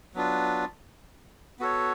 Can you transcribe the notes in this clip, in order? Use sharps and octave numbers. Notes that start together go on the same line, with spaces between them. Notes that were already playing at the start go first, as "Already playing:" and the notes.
F#3 B3 D4 F4
B3 F#4 A4 C#5